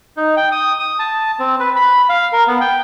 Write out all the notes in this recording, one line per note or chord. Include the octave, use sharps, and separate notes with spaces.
D#4
G5
D#6
D#6
A5
C4
B4
B5
F5
A#4
B3
G5